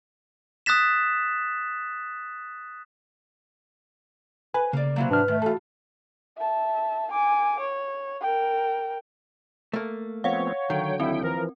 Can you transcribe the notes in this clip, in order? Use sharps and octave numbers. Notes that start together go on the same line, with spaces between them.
D#6 F#6 A6 B6 E7
B4 G#5
C#3 A#3 D5
C3 E3 F#3 A#3
G#2 D4 B4 F6
D#3 A3
E3 F4 F#4 A4 A5
E5 A5
G#5 D6
C#5
A#4 G5
A3 A#3
F3 B3 C4 C#5 F5 F#5
D3 D#3 F#3 G5
D#2 C4 E4
E3 F3 A#4